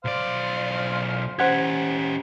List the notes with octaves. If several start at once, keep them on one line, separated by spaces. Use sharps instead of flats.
B1 C5 D5 F5
C#4 G4 C5 F#5 G#6